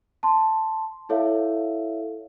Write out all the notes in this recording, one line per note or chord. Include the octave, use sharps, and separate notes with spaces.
A5 C6
E4 A4 C#5 E5 F5